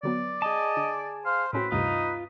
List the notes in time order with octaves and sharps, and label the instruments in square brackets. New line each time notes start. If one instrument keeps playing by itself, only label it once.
[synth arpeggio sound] D3 F#3 B3 [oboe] D5
[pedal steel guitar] G#4 A5 [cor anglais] D#5
[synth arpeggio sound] D3
[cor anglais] C5 [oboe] F5
[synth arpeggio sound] A2 C#4 F#4 [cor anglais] C4 [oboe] B4
[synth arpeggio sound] D2 G2 C3 [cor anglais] D#4 [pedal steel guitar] F4